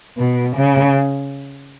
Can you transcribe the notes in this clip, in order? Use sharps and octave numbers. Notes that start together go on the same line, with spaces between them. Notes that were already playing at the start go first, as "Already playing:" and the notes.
B2
C#3